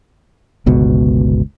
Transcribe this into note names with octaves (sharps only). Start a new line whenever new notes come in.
G1 C#2 B2